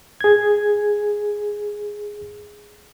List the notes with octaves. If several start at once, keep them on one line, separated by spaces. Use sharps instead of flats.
G#4 G#6